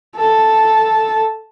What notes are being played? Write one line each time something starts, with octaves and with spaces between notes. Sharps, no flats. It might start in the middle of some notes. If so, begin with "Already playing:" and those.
A4 A5